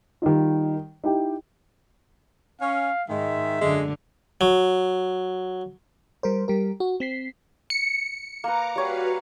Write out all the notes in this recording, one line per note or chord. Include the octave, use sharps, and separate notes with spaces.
D#3 G3 D#4 F4
D#4 E4 G4 G5
C#4 F5
G#2 D#3 G#3 E5
F#2 D3 G#3
F#3
G3 A#4 C5
G3 G4 A#4
F#4
C4 B6 C7
C#7
A#3 B4 A#5 D6
G3 F#4 B4 C#5 F5